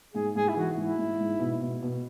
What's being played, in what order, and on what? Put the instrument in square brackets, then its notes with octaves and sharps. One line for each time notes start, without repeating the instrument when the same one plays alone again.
[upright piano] G#2 [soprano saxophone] G#4
[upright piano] G#2 [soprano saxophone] G#4
[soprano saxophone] E4
[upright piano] E3 [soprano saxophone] F#4
[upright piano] G#2 [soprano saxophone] E4
[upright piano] G#2
G#2
B2
B2
B2